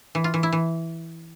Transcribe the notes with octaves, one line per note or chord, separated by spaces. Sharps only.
E3
F4
E3
E4
E3